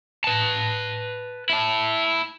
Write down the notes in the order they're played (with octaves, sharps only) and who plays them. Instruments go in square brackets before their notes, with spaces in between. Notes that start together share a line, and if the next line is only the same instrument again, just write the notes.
[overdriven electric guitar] B4 A5
E4 A5